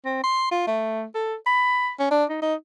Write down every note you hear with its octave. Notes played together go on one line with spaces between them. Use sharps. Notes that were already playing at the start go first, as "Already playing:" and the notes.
C4
C6
F4
A3
A4
B5
C#4
D4
D#4
D#4